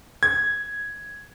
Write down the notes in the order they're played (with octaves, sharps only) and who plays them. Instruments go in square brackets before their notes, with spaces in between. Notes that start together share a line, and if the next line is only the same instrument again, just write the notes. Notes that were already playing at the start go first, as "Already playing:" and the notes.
[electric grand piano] G#6